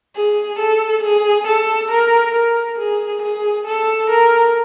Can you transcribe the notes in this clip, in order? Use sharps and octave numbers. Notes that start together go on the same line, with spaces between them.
G#4
A4
G#4
A4
A#4
A#4
G#4
G#4
A4
A#4